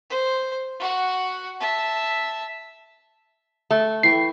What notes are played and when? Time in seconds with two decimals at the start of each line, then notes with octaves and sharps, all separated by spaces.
0.10 C5
0.80 F#4 F#5
1.60 E5 A5
3.71 A3
4.03 E3 G5 C#6 C7